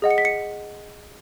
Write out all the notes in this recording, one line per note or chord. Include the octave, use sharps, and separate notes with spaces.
G#4 D#5 F#5
C#7
B6
C#7